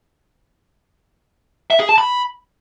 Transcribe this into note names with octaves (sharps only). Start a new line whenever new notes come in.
E5
G#4
A5
B5